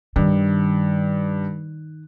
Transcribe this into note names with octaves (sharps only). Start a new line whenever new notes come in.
G2 D#3